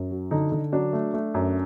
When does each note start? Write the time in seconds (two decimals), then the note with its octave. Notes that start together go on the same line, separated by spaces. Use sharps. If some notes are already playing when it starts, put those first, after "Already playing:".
Already playing: F#2
0.11 F#3
0.31 D3 D#4
0.52 D3
0.72 F#3 D4
0.93 A3
1.14 A3
1.34 F#2